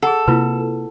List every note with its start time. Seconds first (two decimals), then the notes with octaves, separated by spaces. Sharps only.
0.02 G#4 A4 F#5
0.28 C3 A#3 E4 F4 B4